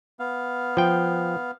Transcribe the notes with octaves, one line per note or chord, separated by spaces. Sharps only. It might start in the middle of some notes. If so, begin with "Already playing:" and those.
B3 F5
F3 G5